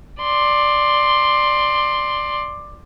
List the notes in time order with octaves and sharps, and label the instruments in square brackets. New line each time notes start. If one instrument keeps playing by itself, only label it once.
[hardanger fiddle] D5 C6